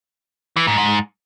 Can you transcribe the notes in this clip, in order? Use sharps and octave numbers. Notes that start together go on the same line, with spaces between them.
E3
G#2
G#2